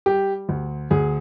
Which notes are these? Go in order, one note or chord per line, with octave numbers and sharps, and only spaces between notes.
G3 G4
D2
D2 G#4